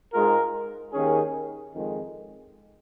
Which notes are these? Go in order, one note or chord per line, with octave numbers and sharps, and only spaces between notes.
G#2 G#3 F4 A#4
D#2 D#3 C#4 G#4
F2 D#3 G#3